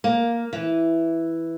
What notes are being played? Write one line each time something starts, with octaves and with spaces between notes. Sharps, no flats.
A#3
E3